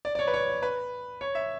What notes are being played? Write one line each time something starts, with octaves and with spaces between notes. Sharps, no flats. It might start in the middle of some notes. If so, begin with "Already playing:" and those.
D5
D5
C#5
B4
C#5
B4
C#5
E5